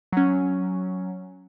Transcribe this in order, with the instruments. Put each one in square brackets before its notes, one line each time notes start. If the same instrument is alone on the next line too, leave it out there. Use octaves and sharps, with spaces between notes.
[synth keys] F#3 C#4